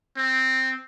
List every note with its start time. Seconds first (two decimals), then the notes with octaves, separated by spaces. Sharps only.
0.17 C4